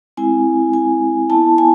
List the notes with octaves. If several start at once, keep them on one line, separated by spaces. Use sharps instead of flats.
G#3 C4 E4 G#5
G#5
B3 E4 A5
G#5